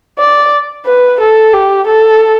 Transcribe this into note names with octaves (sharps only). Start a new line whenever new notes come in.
D5
B4
A4
G4
A4